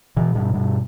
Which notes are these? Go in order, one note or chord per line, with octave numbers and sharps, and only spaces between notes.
B2 E3
G2 B2
G2 B2